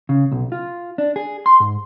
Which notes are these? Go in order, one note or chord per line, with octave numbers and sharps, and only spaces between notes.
C#3
B1
F4
D4
G#4
C6
G#2